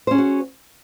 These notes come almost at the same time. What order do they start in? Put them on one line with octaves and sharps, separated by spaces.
C5 C#4 G#4 F#4